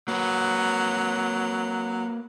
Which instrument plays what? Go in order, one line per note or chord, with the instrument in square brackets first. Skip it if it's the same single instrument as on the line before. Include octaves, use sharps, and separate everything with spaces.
[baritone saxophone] F#3 [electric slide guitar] A#3 B4